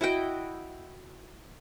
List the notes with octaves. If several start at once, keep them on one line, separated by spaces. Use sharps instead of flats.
E4 F#4 D#5 G5